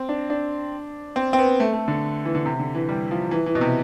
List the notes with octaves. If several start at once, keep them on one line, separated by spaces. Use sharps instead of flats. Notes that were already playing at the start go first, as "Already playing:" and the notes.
Already playing: C4
D4
D4
C4
C4
B3
A3
A3
D3
E3
D3
C3
D3
E3
G3
F3
E3
E3
B2
C3